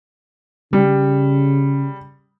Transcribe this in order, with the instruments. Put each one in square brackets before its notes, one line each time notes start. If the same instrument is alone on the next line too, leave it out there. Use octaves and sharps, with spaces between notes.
[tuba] C#3 [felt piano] G3